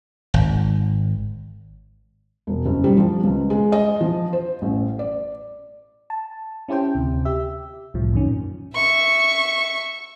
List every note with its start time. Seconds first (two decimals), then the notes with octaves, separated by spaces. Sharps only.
0.34 G#1
2.47 E1
2.66 F#1
2.84 G3
2.97 F3
3.24 C#2
3.50 G#3
3.72 D#5
4.01 F3
4.33 C5
4.62 A1
4.99 D5
6.10 A5
6.68 C#4 E4 G4 C5 G5
6.95 D2 C3
7.25 G4 E5
7.94 C2 A2 F3
8.12 F#2 A#2 D#3 C#4
8.74 E5 C#6